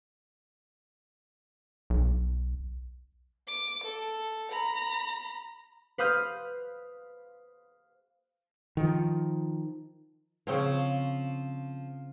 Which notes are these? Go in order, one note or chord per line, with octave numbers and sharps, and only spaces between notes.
B1
D6
A4
A#5 B5
B4 C5 F5 D#6 F6 G6
D#3 F3
C#3 F3 C4 C#5